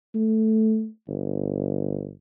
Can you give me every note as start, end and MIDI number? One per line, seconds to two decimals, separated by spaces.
0.15 0.88 57
1.07 2.12 31